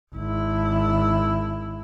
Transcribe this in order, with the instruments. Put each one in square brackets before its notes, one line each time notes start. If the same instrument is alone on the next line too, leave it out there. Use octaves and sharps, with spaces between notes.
[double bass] G#1 E4